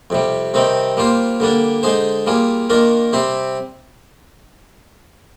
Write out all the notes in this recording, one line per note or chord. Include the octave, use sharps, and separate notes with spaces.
F2 C3 G3
C3 D#3 G3 C4 D#4
G3 A#3 F4 C5
D3 G3 A#3 D4
D3 G#3 D#4 G#4 C5
G3 A#3 F4 G#4
D#3 A#3 D4 F4 A#4
C3 G3 C4 G4 C5